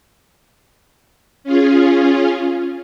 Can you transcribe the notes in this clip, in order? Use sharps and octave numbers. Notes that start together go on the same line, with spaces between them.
C#4 F4 G#4